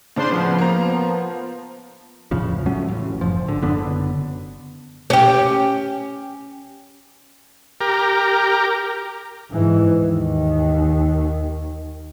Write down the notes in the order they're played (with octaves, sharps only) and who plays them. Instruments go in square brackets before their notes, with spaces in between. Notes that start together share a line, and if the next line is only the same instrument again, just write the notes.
[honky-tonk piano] A2 C#3 [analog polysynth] D4 C5 C6
[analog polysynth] F3 B3
[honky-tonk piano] A#3 A#5
[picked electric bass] E2 A2 C#3 F3
F#3 A3 C#4
A1
F#1 F3
G#1 D3
F#1 D3 B3 D4
[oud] C#4 G4
[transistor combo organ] G4 A#4
[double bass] G#2 E3
D#2 D#3